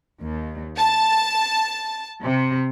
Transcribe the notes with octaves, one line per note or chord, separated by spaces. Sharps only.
D#2
A5
C3